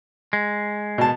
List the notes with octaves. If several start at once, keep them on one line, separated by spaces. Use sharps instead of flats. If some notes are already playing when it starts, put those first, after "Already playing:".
G#3
B2 A5